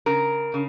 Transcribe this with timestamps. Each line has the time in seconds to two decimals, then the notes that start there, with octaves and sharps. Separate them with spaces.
0.06 C#3 A#4
0.54 C#3